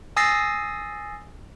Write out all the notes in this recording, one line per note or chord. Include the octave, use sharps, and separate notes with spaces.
G#5 D#6 E6 A6 A#6 C7